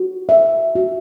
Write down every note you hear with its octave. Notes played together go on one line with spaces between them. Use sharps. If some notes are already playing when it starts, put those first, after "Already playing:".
Already playing: F#4
E5
F#4